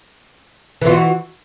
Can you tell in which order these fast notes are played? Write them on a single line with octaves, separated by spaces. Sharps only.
E3 F4 F#4